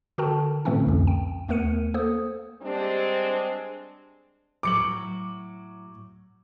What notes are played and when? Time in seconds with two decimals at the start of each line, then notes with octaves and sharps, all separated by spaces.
0.18 D3 F#4 A4 A#4 G5 A5
0.65 A2 D3 E3 A3 C4 C#4
0.86 C2 F2
1.07 G5
1.48 D#2 A3 B3 A#4 C#7 D#7
1.94 A#3 A4 C5 D#6
2.62 G3 G#3 C4 D4
4.63 A2 F#3 D6 C#7 F#7